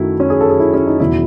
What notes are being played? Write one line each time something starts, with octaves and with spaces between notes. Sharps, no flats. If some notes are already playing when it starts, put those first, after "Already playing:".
Already playing: F#2 D#3 F#3 A3 E4
C#4
G#4
A4
G#4
E4
C#4
D#4
E1 E2 D#3 F#3 E4